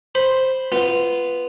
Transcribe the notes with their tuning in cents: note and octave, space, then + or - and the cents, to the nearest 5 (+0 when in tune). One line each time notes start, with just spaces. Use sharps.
C5 +0 B5 +0
B3 +0 F4 -20